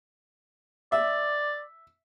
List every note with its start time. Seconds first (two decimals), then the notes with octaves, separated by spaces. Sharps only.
0.92 D5 E5